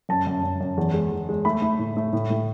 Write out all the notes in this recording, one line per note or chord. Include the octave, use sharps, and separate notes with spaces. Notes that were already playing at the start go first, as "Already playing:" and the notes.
F#2 A5
F#2
F#2
F#2
E2
G#3
E2
G#3
A3 B5
A3
A2
A3
A2
A2